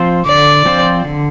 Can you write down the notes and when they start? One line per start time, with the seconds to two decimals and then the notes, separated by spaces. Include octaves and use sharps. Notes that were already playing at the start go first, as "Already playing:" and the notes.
Already playing: F3 C4 F4 C5
0.26 D3 D5
0.65 F3 C4 F4 C5
1.05 D3